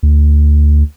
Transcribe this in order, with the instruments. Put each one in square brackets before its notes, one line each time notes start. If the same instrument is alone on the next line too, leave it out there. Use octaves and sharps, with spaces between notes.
[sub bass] D2